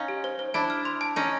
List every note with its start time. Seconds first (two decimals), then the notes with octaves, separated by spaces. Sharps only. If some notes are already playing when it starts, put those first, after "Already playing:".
Already playing: C#4 D#4 F5
0.08 G4
0.24 C5
0.39 C5
0.54 D4 E4 A5
0.70 F6
0.85 C6
1.01 A5
1.16 C#4 D#4 A5